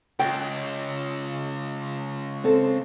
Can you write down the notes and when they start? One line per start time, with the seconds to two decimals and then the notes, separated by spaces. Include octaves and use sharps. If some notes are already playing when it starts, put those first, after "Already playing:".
0.19 C#2 G5
2.44 C4 A4